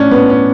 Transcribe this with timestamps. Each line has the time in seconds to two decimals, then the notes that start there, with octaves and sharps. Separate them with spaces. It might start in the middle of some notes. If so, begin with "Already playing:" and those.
Already playing: A2 C#4 D4
0.11 A2 B3
0.30 C#4